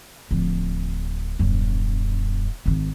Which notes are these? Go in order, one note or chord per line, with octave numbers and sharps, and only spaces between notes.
D1 F3
D#1 F#2
G#1 D#3